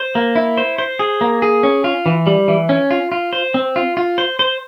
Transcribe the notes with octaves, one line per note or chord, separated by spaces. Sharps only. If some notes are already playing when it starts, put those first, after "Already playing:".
Already playing: C5
A#3
E4
C5
C5
G#4
A#3
G#4
C#4
F4
E3
G3
E3
C#4
F4
F4
C5
C4
F4
F4
C5
C5